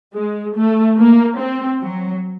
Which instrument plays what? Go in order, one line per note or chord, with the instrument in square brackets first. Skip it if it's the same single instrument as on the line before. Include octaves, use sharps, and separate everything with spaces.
[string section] G#3
A3
A#3
C4
F#3